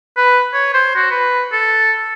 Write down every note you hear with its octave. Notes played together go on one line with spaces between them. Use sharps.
B4
C#5
C5
F#4
B4
A4